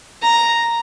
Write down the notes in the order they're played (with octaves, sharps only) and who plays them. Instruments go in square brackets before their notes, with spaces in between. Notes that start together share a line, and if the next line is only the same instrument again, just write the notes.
[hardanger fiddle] A#5